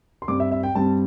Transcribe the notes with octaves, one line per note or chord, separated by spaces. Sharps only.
C6
G2 G3 C4 D6
E5
E5
G5
G2 G3 C4 A5